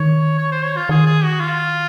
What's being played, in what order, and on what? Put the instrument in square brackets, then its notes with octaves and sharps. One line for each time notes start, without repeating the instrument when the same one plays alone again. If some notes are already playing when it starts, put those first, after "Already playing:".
Already playing: [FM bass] D#3 [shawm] C#5
[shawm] C#5
C5
C#5
F4
[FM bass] D#3 [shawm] G#4
[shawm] G#4
F#4
F4